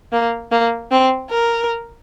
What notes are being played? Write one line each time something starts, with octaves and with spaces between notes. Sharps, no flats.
A#3
A#3
C4
A#4